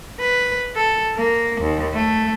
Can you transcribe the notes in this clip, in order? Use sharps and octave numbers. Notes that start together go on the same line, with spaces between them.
B4
A4
A#3
D#2
A3